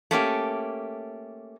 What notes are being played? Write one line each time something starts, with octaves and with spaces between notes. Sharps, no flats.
A3 A#3 C#4 G4